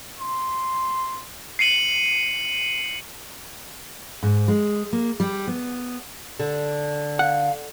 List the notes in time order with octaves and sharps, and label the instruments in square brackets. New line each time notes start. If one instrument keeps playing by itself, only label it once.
[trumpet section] C6
[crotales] C7 C#7 D#7 F#7
[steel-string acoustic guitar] G#2
G#3
A#3
G3
B3
[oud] D3
[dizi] F5 [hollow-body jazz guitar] F#5